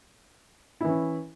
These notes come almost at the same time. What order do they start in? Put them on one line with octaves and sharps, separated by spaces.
E4 E3 C#4